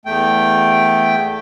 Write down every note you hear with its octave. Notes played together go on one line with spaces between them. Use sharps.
E2 A3 G5